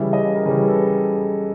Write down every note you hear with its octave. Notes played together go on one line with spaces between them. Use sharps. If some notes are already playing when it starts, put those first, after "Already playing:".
Already playing: C#3 E3 G3 E5
D#5
A#4
C#3 E3 G3 B4
A4